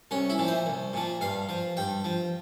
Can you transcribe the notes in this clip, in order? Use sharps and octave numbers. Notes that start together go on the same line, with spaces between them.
C2 C#4
E4
A#2 F3
C5
C2
A#2 F3
G2 F5
F3
G2 G5
F3